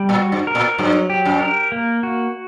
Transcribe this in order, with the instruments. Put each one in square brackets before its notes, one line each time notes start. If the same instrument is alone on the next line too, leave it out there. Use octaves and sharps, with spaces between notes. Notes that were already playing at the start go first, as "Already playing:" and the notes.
Already playing: [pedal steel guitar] G3
[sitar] A#2
[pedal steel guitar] F#4
[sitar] G2
[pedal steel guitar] A#4
[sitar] A#2
[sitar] G2 [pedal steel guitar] F#3
[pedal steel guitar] G4
[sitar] F#2
[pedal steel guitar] A#4
A#3
F#4